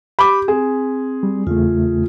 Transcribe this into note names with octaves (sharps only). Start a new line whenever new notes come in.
G4 B5 D6
C4 G#4
G3
E2 C#3 A3 F4